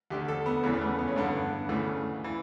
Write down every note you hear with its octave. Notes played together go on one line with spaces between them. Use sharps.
D2 D3 G4
A4
B3
E2 C#3 E3 B3
B3
A3
B3
C#4
G2 D3 B3
D2 C#3 E3 A3
E3